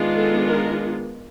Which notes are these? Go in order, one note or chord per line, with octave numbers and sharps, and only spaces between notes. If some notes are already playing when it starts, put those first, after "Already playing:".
Already playing: D#3 G#3 B3 D4 F4
A4
A#4